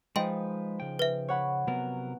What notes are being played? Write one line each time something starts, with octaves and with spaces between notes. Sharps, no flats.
F3 G#3 D#4 B4 D#5 G5 C6
C#3 G5
B4 E5
C#5 F#5 B5
C3 F#3 B3 A#4